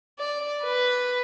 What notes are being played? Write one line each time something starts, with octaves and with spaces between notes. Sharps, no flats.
D5
B4